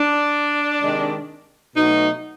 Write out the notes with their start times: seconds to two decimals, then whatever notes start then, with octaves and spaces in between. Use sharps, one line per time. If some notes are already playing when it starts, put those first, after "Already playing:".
Already playing: D4
0.82 C3 D#3 G#3
1.76 B2 F#3 A3 D#4